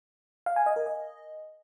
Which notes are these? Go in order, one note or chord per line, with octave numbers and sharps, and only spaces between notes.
F5
G#5
D#5
A#4
D#5